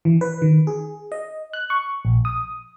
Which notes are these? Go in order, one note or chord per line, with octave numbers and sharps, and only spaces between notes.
E3
B4
D#3
G#4
D#5
F#6
C#6
A#1
D#6